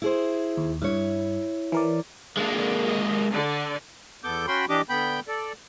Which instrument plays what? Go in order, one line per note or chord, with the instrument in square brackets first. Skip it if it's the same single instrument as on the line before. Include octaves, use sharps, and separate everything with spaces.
[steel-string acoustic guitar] E4 G#4 C5
[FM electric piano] D#2
[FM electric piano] G2 [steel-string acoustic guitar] E4 C#5
[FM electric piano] E3 A#4 D5
[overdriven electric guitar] G#3 A#3 [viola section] D4
[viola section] D#5
D3 D5
[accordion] E2 B3 A4 D6 G6
C#4 F#4 G5 B5 C6
E3 D4 G4 D#5 D6
D3 B3 G5 B5 G6
A4 D5